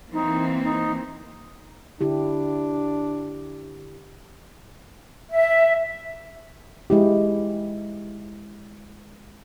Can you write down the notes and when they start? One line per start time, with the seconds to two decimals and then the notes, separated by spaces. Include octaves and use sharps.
0.13 E3 A#3 C4 D#4
0.63 D#4
2.01 D3 D4 E4 G4
5.29 E5
6.90 G#3 E4 G4